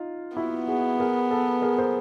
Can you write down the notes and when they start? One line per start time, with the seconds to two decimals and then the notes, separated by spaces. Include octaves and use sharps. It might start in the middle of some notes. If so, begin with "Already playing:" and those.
Already playing: D#4 F4
0.37 B3 E4 F#4
0.68 F#4 G#4
1.00 G#4 A#4
1.31 A4 B4
1.62 G#4 A#4
1.78 A#4 C5